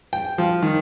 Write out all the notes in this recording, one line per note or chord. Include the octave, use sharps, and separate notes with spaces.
G5
F3
D#3